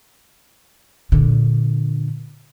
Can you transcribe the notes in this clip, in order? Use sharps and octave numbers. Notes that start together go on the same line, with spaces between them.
A#2 D3